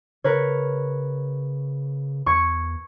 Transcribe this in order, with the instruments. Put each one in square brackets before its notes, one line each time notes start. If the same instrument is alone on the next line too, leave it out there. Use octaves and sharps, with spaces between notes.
[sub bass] C#3 [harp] A#4 B4 C#5
[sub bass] E2 [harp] C#6 G#6 C#7